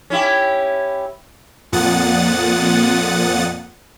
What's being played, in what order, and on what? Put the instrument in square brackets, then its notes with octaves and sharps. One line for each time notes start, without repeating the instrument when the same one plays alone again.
[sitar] C#4 E4 G4
[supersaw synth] F2 A#2 F#5 D#6 A6